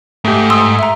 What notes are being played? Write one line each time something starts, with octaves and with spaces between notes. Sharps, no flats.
G#2 A3 G4
C6 D#6 E6
E5 A#5